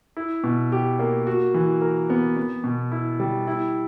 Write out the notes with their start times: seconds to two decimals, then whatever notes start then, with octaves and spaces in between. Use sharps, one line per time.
0.17 E4
0.44 B2
0.72 G4
0.99 A#3
1.27 F#4
1.54 E3
1.81 A#4
2.10 B3
2.37 B3
2.64 B2
2.92 E4
3.20 G3
3.47 E4